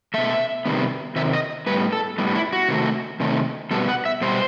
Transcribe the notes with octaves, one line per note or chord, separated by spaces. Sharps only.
B2 A3 E5
C3 D#3 G3 B3
C3 D#3 E5
D#5
A2 G3 B3 B4
A4
A2 G3 B3
E4
F#4
C3 D#3 A3
C3 D#3 A3
B2 G3 B3 A4
F#5
E5
B2 G3 B3 C5